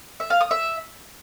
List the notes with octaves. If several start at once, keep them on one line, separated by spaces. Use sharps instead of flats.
E5
F5
D#6
E5